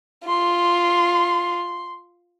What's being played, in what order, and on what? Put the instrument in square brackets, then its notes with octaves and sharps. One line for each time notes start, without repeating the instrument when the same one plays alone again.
[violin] F4 [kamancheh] C6